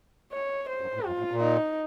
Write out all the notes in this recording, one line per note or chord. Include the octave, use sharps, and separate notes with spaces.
C#5
C5
F#2
A2
F#2 F4
A2
A#2
D#4